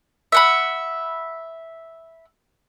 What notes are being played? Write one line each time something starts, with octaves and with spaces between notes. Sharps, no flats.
E5 F#5 B5